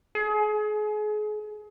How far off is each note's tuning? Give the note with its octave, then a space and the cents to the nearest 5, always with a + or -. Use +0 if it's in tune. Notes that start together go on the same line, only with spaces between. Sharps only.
G#4 +35